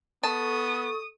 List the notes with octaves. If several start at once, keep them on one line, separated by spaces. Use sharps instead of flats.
B3 A4 A5 C#6 D#6